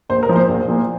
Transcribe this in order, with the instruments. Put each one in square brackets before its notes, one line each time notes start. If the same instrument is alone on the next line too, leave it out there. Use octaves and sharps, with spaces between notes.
[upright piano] A#1 C5
A#4
A#2 F3
C5
A#1
A#2 F3